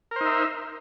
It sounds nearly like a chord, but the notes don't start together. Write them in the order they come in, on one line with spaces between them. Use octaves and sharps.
A#4 C5 D#4 E5